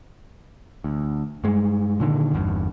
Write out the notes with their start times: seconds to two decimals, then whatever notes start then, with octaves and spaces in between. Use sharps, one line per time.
0.84 D2
1.44 G2 G#3
2.00 A#2 D3 D#3
2.33 G1 E2 G2